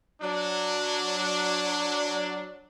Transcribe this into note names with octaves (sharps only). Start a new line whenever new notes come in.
F#3 D4